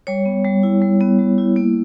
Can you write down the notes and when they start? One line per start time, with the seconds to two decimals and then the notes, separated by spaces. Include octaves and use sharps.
0.07 G3 C#5
0.25 B3
0.45 G3
0.63 E4
0.82 G3
1.01 B3
1.19 G3
1.38 E4
1.56 A#3